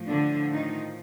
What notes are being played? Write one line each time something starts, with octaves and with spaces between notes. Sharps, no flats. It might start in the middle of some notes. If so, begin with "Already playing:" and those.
Already playing: A2 F3
D3 D4
D#3 D#4